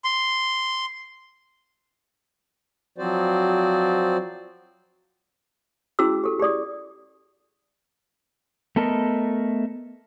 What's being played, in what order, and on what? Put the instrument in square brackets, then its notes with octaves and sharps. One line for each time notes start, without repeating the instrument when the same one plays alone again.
[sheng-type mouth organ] C6
[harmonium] F3 F#3 C4 F#4 C5 D5
[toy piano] C#4 E4 F#4 G#4 E6
G4 A4
G4 G#4 D5 D#6
[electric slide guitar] A3 B3 A4 A#4 D#5